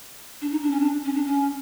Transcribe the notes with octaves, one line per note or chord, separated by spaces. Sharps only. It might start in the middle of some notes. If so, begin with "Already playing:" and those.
D4
D#4
D4
C#4
D4
C#4
D4
C#4